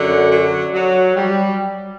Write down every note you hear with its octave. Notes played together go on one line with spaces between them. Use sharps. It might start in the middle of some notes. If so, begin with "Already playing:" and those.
Already playing: F#2 D3 F#3
F#3
F#3
G3